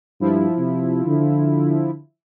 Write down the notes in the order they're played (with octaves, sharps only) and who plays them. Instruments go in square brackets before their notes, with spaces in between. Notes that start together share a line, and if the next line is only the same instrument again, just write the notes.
[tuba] G2 [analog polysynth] F3 E4
[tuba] C3
D3